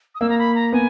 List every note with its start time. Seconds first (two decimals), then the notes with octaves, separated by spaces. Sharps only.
0.15 D#6
0.21 A#3 E6
0.29 A#5
0.39 B5
0.55 A#5
0.73 B3 G#5